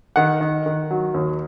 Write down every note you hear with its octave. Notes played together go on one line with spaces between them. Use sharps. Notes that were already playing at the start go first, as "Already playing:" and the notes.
D#3 F#5
D#3
D#3
F#3
D#2